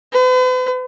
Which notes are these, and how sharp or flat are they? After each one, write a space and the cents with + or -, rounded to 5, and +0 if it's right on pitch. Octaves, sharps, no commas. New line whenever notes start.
B4 +45